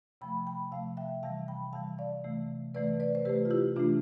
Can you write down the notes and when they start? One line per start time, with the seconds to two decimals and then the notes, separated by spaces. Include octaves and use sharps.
0.21 C3 F3 A3 G5 B5
0.46 G5 B5
0.72 C3 F3 A3 F5 A5
0.97 E5 G5
1.23 C3 E3 G3 F5 A5
1.48 G5 B5
1.73 C3 E3 G3 F5 A5
1.99 D5 F5
2.24 C3 E3 A3
2.74 C3 E3 A3 B4 D5
3.00 B4 D5
3.15 C5
3.25 C3 E3 A3 G4 B4
3.45 F4
3.50 E4 G4
3.76 C3 E3 A3 D4 F4